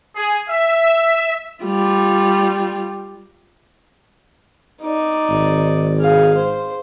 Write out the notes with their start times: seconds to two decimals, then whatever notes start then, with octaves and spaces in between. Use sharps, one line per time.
0.16 G#4
0.49 E5
1.64 G3 F4
4.82 D#4 D5
5.30 G#1
5.99 G#4 F5
6.36 C5